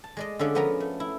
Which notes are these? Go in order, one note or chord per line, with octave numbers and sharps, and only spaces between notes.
A5
G#3 D5 D#5
D3 C#4 G#4 A4 D5 F5
F3 B3 C#4 A#4 D5 A#5
A3
E4